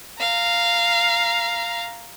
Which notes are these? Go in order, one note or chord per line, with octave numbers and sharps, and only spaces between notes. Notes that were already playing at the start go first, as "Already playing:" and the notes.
F5 A#5